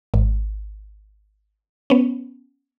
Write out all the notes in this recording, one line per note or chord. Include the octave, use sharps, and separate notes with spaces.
G#1
B3 C#4